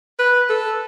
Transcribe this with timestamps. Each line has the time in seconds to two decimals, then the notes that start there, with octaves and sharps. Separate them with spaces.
0.19 B4
0.50 A4